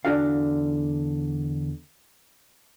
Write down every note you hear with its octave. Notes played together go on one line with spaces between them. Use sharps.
E2 D3 D4 F#4 F5